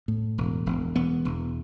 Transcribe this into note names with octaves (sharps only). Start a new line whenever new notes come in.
A2
E1
E1
E1 B3
E1